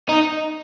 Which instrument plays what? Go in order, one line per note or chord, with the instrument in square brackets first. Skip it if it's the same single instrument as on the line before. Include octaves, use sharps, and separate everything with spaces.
[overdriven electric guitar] D#4